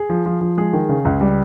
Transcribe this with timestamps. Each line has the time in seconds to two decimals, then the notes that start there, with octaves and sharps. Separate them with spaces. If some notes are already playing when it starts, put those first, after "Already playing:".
Already playing: G#4
0.09 F3
0.26 F3
0.41 F3
0.57 G#3 G#4
0.73 D#3
0.89 C#3
1.05 C#2
1.21 G3